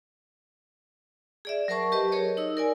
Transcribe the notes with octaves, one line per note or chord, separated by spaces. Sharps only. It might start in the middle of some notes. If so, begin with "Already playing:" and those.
G#4 D5 E5
F#3 A#4 C5 A5 C#6
G4 B4 D#5 A5
G#4 A#4 C#5 D#5
D#4 E6
A#4 D5 G#5